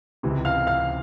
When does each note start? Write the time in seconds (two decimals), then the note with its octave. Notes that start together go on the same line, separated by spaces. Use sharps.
0.23 C#2 C3 E3
0.45 F5 F6
0.67 F5 F6